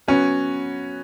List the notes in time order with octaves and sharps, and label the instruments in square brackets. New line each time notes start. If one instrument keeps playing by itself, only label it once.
[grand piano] F#3 B3 F#4 B4 [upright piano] C#4